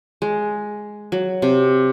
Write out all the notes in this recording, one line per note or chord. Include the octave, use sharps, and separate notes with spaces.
G#3
F#3
C3